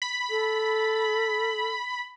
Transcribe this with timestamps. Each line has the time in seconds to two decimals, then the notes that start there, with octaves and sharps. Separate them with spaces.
0.02 B5
0.30 A4